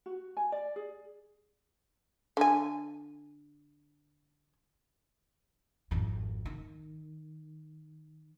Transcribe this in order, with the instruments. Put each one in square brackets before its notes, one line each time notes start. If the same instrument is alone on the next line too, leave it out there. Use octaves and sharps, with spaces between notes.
[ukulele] F#4
G#5
D5
G#4
[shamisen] D3 G#5
[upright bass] G#1 F2
D#3